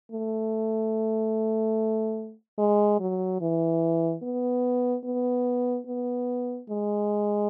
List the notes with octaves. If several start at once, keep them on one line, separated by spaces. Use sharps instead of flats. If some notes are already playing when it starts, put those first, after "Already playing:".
A3
G#3
F#3
E3
B3
B3
B3
G#3